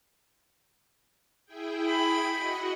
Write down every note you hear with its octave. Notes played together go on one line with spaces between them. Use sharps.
E4 G#4 G5
B5
F#4 D#5 F#5